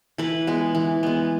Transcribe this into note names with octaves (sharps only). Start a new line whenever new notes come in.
E3 B4
G#3 B3
E3
G#3 B3